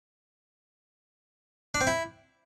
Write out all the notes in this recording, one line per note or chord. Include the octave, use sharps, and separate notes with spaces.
D4
C4
E4